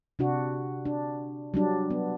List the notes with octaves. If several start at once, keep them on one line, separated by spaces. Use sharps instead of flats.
C3 D4 F#4
D4
F#3 G3 D4
B3